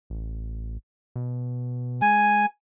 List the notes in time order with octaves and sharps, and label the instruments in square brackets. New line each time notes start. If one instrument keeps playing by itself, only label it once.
[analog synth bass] A1
B2
[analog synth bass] G#3 [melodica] G#5